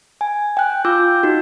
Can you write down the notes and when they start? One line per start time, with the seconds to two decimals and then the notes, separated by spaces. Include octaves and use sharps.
0.21 G#5
0.57 G5 F#6
0.85 F4 D6 E6 G6
1.23 D#4 F#4